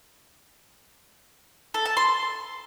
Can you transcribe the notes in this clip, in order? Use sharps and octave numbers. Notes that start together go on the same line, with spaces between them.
A4
A5
C6